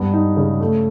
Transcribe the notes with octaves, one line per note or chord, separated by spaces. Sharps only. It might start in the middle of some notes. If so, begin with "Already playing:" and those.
Already playing: G2 B3
D#4
C#3
A3